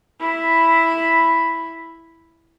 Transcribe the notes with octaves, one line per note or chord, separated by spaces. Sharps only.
E4 B5